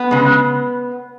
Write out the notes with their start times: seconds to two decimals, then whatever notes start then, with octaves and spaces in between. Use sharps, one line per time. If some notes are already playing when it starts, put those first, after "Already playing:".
Already playing: B3
0.11 C#3 G#3